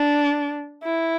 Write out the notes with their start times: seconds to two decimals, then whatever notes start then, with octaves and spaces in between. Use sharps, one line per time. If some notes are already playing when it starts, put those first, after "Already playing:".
Already playing: D4
0.84 E4